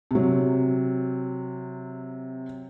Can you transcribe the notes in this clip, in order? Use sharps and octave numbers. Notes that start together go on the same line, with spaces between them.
C3 F#3